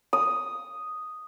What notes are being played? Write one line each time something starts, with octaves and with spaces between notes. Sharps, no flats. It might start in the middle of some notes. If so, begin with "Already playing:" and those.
D#6